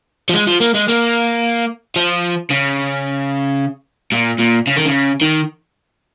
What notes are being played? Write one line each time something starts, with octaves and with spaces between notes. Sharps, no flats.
F3
G#3
F3
A#3
G#3
A#3
F3
C#3
A#2
A#2
C#3
D#3
C#3
D#3